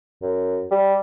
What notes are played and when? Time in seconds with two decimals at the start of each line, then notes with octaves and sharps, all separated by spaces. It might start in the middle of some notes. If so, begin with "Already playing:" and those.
0.22 F#2
0.71 G3